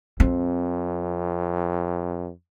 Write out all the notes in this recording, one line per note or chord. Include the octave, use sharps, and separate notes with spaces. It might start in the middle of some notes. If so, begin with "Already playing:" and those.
F2 C4